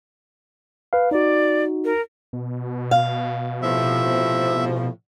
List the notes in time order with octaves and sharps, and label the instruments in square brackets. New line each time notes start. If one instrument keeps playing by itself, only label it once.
[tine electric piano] B4 F5
[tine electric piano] D#4 F#4 [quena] D5
[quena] A#4
[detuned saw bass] B2
[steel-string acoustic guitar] F5
[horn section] A2 C3 F3 [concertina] E5